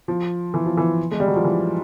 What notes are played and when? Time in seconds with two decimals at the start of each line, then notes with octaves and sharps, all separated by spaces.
0.08 F3
0.54 E3
0.66 F3
0.77 E3
1.11 G#3
1.20 G3
1.28 F#3
1.36 F3
1.44 E3